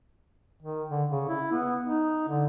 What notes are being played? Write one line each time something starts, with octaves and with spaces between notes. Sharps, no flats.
D#3
D3
C#3
E4
B3
D#4
D3